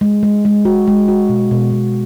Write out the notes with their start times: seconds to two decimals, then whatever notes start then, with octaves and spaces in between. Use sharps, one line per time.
0.01 G#3
0.23 G#3
0.45 G#3
0.65 F#4
0.87 G#3
1.08 F#4
1.29 B2
1.51 B2
1.72 B2